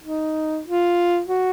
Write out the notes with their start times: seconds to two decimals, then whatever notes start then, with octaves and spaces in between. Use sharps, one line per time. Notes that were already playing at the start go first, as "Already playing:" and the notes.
0.04 D#4
0.65 F4
1.27 F#4